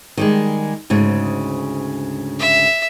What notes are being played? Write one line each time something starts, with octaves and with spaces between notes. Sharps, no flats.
D#3 G3 G#3
D2 G#2 C#3
E5